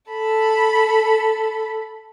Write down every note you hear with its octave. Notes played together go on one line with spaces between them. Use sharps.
A4 B5